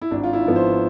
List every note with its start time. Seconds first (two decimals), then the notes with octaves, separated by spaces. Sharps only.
0.02 E4
0.11 G#1 D4
0.24 F4
0.33 E4
0.45 G#2 F3 B3
0.56 C5